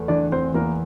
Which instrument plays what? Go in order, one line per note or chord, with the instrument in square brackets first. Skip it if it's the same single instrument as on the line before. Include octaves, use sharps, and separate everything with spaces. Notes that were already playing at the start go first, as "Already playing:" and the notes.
Already playing: [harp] E2 A3
[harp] E3 [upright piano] D4 D5
[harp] E2 [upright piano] C4 C5
[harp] E2 [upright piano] A#3 A#4